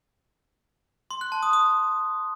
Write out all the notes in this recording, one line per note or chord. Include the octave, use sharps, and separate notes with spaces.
C6
F#6
A5
D#6
D#6